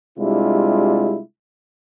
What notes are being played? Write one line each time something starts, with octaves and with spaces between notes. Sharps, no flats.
C3 G3 G#3 D4 E4 F4